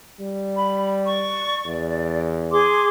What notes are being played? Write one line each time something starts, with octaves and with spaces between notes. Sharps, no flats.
G3
B5
D5 C#6
E2 D5
G#4 C6 D6